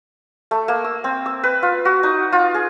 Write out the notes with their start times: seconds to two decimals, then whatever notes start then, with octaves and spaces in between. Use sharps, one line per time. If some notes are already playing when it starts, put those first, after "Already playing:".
0.51 A3
0.68 A#3
0.84 E6
1.04 C4
1.26 E6
1.44 B4
1.63 F4
1.85 F#4
2.03 D#4
2.32 F4
2.54 G#4